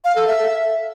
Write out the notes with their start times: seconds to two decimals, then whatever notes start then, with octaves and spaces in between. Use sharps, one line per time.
0.04 F5
0.16 A4
0.27 E5